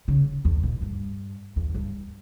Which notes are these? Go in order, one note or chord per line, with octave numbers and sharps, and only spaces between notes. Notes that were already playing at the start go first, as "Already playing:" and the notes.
C#3
E2
A#2
G2
E2
G2